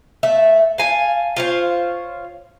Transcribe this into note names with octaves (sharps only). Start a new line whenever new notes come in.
A3 E5
F5 G#5 A5
F4 C5 C#5